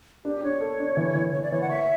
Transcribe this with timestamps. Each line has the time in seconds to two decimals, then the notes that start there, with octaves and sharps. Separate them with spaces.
0.25 D4 G4
0.43 D4 C#5
0.61 A4
0.80 D4
0.97 E3
1.15 E3
1.33 E3 C#5
1.43 D5
1.52 E3 C#5
1.61 F#5
1.69 C#5 E5